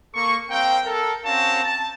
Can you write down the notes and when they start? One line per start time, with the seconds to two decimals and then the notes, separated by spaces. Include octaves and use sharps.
0.14 A#3 A4 C#6
0.50 G3 C4 A#4 F5 G5
0.85 A4 A#4
1.25 C4 C#4 F#4 F5 A5 A#5
1.63 A5